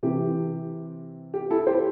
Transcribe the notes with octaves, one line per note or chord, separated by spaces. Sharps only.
C3 E3 C4 G4
G4
E4 A4
G4 C5